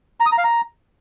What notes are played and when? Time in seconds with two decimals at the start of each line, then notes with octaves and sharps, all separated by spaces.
0.20 A#5
0.26 D#6
0.32 A#5
0.38 F5
0.44 A#5